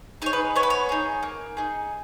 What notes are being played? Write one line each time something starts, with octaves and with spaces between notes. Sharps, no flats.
D#4 G#4 C#5
B4
B3 C#5
B4
C#5
D#4 G#4
A#3
D#4 G#4